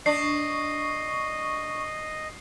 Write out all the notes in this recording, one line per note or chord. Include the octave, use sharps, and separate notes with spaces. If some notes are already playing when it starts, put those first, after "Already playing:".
D4 D#5 C#6 C7